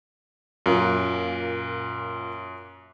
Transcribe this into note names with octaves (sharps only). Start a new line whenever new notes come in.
F#2 A#2 A#3